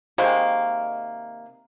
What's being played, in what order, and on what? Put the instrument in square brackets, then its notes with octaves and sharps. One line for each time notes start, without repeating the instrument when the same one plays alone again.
[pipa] C3 D#3 G#3 A#3